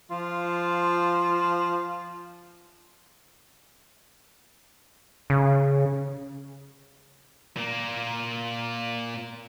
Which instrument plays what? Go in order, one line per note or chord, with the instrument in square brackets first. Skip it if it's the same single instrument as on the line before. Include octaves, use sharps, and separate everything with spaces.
[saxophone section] F3 F4
[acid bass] C#3
[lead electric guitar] A#2 A#3